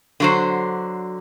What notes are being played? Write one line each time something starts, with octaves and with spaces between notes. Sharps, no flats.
D3 F#3 C5